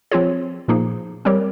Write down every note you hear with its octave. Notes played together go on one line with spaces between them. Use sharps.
F3 C4 F4 G#4 C#5
A#2 F3 A#3 D#4 G#4
G3 C4 G4 A#4 C#5